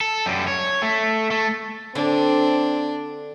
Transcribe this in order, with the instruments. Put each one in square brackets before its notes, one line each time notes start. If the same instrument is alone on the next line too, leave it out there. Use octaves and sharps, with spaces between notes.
[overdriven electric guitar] A4
F#2 G3
C#5
A3
A3
[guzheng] D3 [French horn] C4 [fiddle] D4